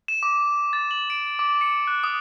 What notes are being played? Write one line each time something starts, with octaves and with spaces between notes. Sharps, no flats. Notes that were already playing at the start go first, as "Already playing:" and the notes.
E7
D6
A6
F#7
D7
D6
C#7
F#6
D#6